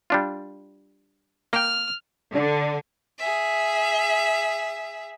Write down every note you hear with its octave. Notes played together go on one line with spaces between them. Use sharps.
G3 D4 F4
A#3 G5 F6
D3
G#4 E5